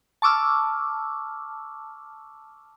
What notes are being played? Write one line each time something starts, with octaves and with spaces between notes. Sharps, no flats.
A5 C#6 D6 E6 F6